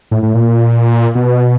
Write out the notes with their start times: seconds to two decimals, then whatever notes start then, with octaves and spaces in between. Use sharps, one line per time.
0.11 A2
0.23 A2
0.34 A#2
1.15 B2